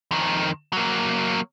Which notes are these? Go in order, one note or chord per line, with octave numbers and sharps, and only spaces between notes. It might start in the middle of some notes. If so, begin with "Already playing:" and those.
F2 D#3
F#3 A#3